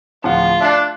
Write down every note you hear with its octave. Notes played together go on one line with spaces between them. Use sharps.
D1 F3 F4 F#5
D4 E5 F#6 C7